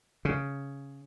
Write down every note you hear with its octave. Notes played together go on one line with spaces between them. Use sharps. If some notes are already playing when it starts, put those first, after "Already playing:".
C#3